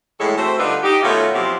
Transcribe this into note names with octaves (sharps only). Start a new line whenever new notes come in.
A2 E3 G#3 E4 A4 C#5
A3 C4 F#4 A4 C5
D3 G3 D4 D#4 F4 B4
D#4 G4
B2 D#3 A3 C#4 F4 C#5
B2 F3 F#3 C4 E4 G4